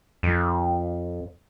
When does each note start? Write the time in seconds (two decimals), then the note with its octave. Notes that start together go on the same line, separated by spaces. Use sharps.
0.23 F2